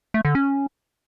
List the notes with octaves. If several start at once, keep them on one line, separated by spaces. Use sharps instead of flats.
A3
D3
C#4